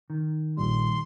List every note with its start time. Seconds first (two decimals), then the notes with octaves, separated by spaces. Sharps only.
0.10 D#3
0.57 A#1 A#2 G3 C6